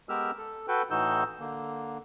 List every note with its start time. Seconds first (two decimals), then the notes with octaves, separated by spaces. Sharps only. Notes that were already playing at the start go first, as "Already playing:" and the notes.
0.09 G#3 B3 G4 A#4 E6 F6
0.38 A4
0.68 F#4 A4 B4 G5
0.91 A2 E3 D#4 F#4 E6 G6
1.40 D3 A#3